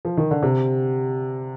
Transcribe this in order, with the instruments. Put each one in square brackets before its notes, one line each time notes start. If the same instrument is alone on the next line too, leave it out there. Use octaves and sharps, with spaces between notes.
[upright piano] F3
D#3
D3
C3